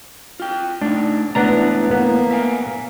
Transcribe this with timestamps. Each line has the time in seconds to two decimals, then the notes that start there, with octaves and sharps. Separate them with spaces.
0.40 F4 G5
0.81 A3 D4 D#4
1.35 G#2 E3 A3 B3 D4 A#5
1.91 A#3 B3
2.31 E5 F5 G#5